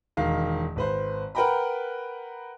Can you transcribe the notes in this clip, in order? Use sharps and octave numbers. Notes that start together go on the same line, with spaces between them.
E1 D#3 F5
G#1 B4 C5
A#4 B4 F#5 G5 A#5 B5